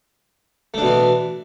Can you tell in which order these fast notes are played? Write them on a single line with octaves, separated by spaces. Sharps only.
A3 D4 B2 E3